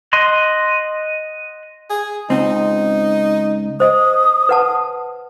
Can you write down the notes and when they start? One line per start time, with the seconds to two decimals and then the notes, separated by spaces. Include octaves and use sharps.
0.13 D#5 F#5 C6
1.90 G#4
2.30 C#2 C4 D#4
3.80 C5 D#5 D#6
4.49 B4 F#5 A5